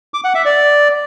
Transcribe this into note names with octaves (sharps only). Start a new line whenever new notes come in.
D6
F#5
E5
D5